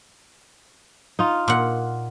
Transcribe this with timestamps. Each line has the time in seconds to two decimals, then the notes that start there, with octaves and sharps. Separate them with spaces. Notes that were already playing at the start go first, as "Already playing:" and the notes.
1.19 D#4 F4
1.48 A#2 F#5